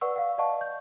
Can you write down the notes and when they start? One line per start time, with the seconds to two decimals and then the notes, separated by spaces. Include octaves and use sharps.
0.01 B4 D5 F#5 C#6 E6
0.16 F5 F#5
0.38 D5 D#5 F5 F#5 A5 C#6
0.61 G6